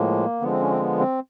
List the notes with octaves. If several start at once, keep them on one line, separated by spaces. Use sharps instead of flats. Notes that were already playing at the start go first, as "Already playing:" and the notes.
Already playing: A2 F3 G#3 A#3
D3 F3 G#3 B3
C4
C#4
C4
B3
C4